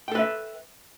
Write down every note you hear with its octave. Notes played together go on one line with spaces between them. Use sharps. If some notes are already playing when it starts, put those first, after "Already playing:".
A4 B4 E5 G5